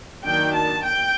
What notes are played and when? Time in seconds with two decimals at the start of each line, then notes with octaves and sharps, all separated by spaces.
0.25 D#3 F#3 A#3 D4 G5
0.57 A5
0.86 G5